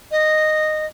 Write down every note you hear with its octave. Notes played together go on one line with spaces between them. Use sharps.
D#5